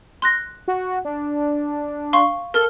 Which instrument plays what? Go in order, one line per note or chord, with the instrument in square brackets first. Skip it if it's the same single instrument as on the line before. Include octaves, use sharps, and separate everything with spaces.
[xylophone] C6 F#6 A#6
[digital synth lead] F#4
D4
[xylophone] F5 C6 C#6
[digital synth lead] A4 [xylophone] A#4 F6 G7